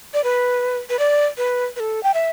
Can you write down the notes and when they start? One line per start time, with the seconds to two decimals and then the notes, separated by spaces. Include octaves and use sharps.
0.14 D5
0.24 B4
0.90 B4
0.99 D5
1.38 B4
1.76 B4
1.80 A4
2.03 G5
2.14 E5